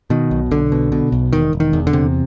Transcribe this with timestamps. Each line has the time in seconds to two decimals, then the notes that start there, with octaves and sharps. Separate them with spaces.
0.10 B2 D#3
0.31 B1
0.51 B1 D3
0.72 B2
0.92 B2
1.12 B1
1.33 E1 D#3
1.53 E1
1.60 D#3
1.73 E2
1.87 D3
1.93 C3